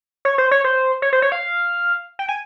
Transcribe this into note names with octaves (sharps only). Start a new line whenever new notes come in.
C#5
C5
C#5
C5
C#5
C5
C#5
F5
G5
G#5